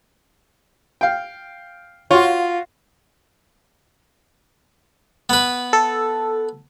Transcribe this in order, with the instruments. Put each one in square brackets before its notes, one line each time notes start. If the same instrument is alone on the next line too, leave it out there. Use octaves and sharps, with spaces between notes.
[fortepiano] F5 G5
[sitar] F4 [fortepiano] F#4 C#5
[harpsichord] B3 B4
[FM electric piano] A4